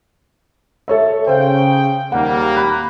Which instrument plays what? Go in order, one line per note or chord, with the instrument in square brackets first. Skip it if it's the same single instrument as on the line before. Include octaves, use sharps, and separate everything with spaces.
[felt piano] A4 C#5 E5
[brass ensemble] C#3 G5 [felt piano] C5 F5
[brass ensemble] D#2 G3 A#3 [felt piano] F#5
[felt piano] B5 F#6